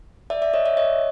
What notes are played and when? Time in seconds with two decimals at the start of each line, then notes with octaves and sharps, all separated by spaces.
0.30 D5 E5
0.42 D5 E5
0.54 C#5 D#5
0.65 D5 E5
0.77 C#5 D#5